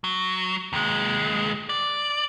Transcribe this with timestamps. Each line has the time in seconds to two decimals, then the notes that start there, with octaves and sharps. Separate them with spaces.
0.04 F#3
0.73 D#2 G#3
1.69 D5